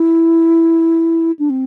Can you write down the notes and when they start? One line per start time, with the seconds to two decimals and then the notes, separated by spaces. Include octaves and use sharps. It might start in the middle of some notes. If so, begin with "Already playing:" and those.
Already playing: E4
1.39 D4
1.50 C4